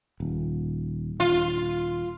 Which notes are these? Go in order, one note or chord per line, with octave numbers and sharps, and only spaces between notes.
D#1
D#1 F4